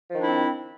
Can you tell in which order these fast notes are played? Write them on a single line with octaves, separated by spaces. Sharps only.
F3 D#3 D4 E4 C4